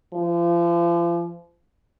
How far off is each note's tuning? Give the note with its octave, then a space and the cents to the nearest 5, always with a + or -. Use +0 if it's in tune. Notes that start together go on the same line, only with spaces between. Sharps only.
F3 -35